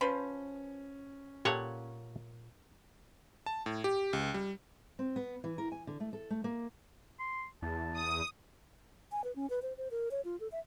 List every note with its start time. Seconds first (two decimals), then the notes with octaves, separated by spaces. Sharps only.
0.01 F3 C#4 B4 C5
1.45 A#2 G4 A4 C#5 F#5
3.46 A5
3.66 A2
3.84 G4
4.13 C#2
4.34 G3
4.99 C4
5.16 B3
5.44 E3
5.58 A#4
5.72 G#5
5.87 D3
6.00 A3
6.13 A4
6.30 A3
6.44 A#3
7.19 C6
7.62 E2 A5
7.97 D#6
9.12 G#5
9.24 B4
9.36 C#4
9.50 B4
9.62 C5
9.78 C5
9.91 A#4
10.11 C#5
10.25 F4
10.40 A4
10.52 E5